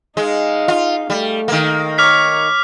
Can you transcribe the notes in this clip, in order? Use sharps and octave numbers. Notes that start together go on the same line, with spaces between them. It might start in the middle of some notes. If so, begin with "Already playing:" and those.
G#3 D#4 F5
F4
G3 A3
D#3 A#3
C#5 D6 F6 B6